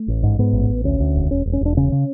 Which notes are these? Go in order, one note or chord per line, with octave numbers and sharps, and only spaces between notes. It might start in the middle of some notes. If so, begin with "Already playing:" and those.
Already playing: A3
A1
G#2
G#2 B3
A1
A1
D2 C#4
D2
E1
E1 C#4
E1
C#4
E1 D4
C#3 C#4
C#3